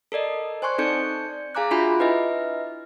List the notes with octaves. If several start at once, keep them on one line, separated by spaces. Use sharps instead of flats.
A4 A#4 D5 D#5
C5 G#5 C6 C#6 F#6
C4 D#4 A4 D5 G6 C#7
G#4 F5 G#5 A#5 D6 F#6
D4 F4 F#4 E5 G#5 B5
E4 B4 D#5 E5